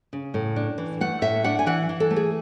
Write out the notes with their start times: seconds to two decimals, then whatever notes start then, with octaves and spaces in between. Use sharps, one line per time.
0.13 C#3
0.34 A2
0.56 D4
0.78 E3
1.01 A3 F#5
1.22 A2 E5
1.44 D4 F#5
1.59 G#5
1.66 E3 F#5
1.89 E3
2.00 A4
2.11 A3
2.16 G#4